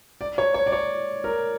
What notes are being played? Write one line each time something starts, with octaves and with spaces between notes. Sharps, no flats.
D5
C#5
C#5
D5
C#5
A#4